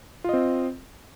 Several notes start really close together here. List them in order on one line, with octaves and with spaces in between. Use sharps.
F4 D#5 C4